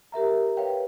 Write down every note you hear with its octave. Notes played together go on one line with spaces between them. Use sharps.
G4 A#4 E5 A#5
B4 C#5 F5 G5